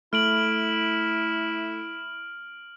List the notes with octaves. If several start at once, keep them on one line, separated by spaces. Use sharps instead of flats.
A3 E4 F6 D7 F#7